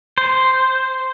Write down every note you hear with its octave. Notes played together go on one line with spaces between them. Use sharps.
C5